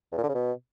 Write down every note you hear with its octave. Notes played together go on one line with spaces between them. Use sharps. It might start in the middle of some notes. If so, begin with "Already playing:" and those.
E2
A#2
D3
C#3
B2